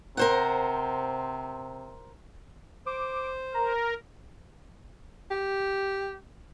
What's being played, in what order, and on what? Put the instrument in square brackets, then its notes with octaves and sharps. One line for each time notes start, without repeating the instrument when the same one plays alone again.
[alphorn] C3 [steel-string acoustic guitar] A#4 C5 F#5
[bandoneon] C5 [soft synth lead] D6
[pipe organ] A#4 [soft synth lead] A#5
[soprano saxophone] G4